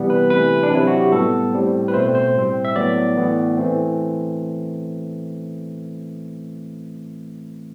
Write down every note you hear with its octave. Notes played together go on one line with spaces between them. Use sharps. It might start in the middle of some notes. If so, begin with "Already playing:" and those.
Already playing: C3 E3 G3 B3
B4
C3 E3 A3 B4
D4
C3 F#3 C4 E4
F#4
G4
A2 G3 B3 A4
A2 G3 C4
B4
B2 A3 C4 C5
C5
A2 G3 C4
E5
A2 F#3 B3 D5
A2 E3 B3
E3 A3 C4